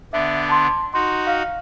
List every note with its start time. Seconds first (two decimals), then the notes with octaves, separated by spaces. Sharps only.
0.13 D3 B3 D4 E5
0.49 A5 C6
0.94 D#4 F#4 C6
1.27 F5 F6